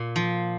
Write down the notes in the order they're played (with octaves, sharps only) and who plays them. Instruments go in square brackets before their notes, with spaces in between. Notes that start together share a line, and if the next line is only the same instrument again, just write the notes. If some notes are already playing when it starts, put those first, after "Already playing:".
Already playing: [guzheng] A#2
F3